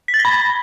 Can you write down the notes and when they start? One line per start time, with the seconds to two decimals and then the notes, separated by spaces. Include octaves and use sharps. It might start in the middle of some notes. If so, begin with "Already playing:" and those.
0.08 B6
0.14 A6
0.19 A#6
0.25 B5